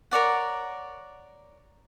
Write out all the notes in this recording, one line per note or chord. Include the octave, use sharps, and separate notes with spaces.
A#4 C#5 D5 F#5